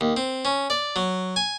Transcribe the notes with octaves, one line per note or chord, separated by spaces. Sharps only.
D#2
C4
C#4
D5
F#3
G#5